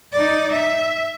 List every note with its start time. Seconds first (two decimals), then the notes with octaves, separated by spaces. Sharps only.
0.12 D#4 D5
0.52 E5